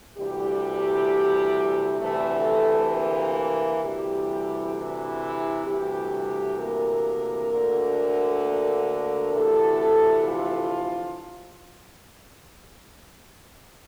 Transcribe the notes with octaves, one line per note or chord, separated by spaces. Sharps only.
D2 C3 E3 G3 G4
D2 C3 E3 A3 A4
A#3 A#4
D2 C3 E3 G3 G4
E3 E4
D2 C3 E3 G3 G4
A#3 A#4
D2 D3
A#3 A#4
D2 C3 E3 A3 A4
F3 F4